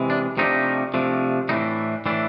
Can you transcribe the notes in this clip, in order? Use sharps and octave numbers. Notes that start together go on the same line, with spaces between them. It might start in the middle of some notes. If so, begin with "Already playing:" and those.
Already playing: C3 E3 G#3
D4
C3 F3 A3 D4 D#4
C3 F3 A3 D4
A2 E3 A3 D4 D#4
A2 E3 A3 D4